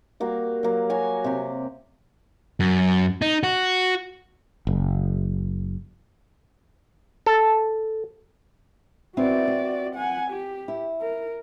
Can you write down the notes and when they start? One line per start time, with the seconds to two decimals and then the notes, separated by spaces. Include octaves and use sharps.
0.20 G3 A#3 F#4
0.63 F#3 A#3
0.90 F#4 C#5 G#5
1.24 C3 G4
2.60 F#2
3.22 D#4
3.43 F#4
4.67 F#1
7.26 A4
9.17 B3 C4 E4 F#4 D5
9.48 C4
9.95 F#5 G#5
10.31 G4
10.68 E4
11.01 A#4